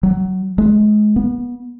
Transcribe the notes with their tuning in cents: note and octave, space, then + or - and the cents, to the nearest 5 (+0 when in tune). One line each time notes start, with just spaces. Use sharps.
F#3 +15
G#3 +30
B3 -25